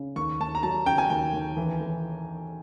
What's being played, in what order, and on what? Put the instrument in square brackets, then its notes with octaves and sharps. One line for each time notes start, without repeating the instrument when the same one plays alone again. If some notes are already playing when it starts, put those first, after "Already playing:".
Already playing: [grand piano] C#3
[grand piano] D#2 [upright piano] C#6
[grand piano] D#2 [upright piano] A5
[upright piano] A#5
[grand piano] F#3 [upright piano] A5
[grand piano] C#3 [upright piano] G5
[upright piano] G#5
[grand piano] D#2 [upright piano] G5
[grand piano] D#2
E3
E3